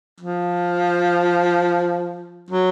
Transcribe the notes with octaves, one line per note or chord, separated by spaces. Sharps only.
F3
F#3